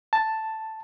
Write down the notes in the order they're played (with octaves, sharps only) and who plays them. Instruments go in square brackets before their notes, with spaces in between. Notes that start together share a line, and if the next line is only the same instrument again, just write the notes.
[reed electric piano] A5